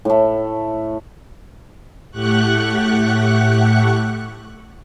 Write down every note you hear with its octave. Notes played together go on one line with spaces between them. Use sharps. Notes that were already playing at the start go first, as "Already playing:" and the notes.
A2 A3
A2 A3 G4 F#5 C#6 F#6